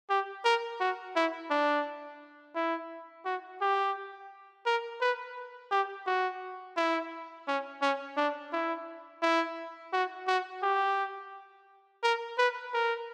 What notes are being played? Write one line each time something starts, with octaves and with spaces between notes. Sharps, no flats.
G4
A#4
F#4
E4
D4
E4
F#4
G4
A#4
B4
G4
F#4
E4
C#4
C#4
D4
E4
E4
F#4
F#4
G4
A#4
B4
A#4